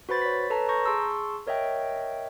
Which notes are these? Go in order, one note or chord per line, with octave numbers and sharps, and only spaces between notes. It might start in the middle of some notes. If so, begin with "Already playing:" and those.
F#4 B4 C5 B5 A6
C#5 B6
A4 B4 C#5 A5 A#5
A#5 C#6 G6 A#6
G#4 A5 C6 C#6 E6
A#4 C#5 D#5 E5 G5